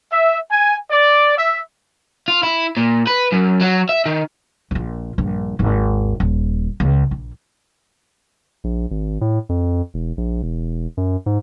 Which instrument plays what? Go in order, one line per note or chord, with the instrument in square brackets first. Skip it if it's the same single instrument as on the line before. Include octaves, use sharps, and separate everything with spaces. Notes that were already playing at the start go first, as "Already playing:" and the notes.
[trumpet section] E5
G#5
D5
E5
[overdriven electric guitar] F4
E4
A#2
B4
F#2
F#3
E5
D#3
[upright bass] A#1 F4
A#1 G2
G#1 D#2
D#1
C#2
A#1
[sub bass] A#1
G#1
A2
F2
E1
A#1
E1
F#2
G#2